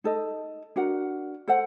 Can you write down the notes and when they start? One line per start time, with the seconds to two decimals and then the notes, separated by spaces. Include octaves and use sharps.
0.04 D#4 A4 D#5
0.76 D4 F#4 A#4 F#5
1.48 A4 C5 F#5